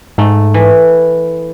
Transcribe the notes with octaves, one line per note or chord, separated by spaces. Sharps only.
G#2 A3
E3